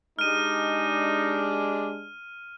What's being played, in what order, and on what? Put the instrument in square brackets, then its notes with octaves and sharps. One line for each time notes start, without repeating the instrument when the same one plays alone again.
[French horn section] G#3 D4 [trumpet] D#4 [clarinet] G4 [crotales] F6 D#7